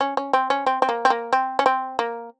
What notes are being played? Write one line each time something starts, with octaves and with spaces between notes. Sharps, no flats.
C#4
C#4
C4
C#4
C4
C4
A#3
C4
A#3
C4
C#4
C4
A#3